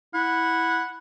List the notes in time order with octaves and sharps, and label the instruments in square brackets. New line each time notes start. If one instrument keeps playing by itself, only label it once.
[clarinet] E4 [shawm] F#5